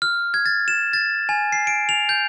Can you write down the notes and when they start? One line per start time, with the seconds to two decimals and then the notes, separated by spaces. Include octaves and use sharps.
0.02 F6
0.34 G#6
0.46 A6
0.68 E7
0.93 A6
1.29 G#5
1.52 C7
1.67 D7
1.89 F7
2.09 G6